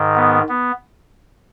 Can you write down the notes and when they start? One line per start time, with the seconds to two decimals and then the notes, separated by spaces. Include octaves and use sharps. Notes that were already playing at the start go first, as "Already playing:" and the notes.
Already playing: G#2 D#3
0.15 B3
0.49 B3